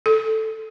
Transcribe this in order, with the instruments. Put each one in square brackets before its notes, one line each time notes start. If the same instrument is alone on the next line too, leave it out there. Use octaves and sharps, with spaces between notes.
[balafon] A4